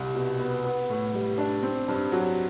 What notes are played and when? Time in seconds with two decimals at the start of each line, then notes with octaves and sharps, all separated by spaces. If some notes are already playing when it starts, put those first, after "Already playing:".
Already playing: C2 G3
0.14 B2
0.40 B3
0.64 B3
0.89 A2
1.13 G3
1.38 D4
1.63 C4
1.88 G2
2.12 F#3